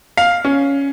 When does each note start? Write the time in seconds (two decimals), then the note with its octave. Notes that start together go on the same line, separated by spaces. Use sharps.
0.17 F5
0.45 C#4